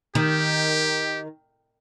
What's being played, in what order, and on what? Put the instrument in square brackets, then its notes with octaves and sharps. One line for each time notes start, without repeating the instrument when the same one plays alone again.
[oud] D#3 [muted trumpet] G4